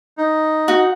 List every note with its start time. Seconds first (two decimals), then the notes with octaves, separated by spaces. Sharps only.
0.18 D#4
0.68 F#4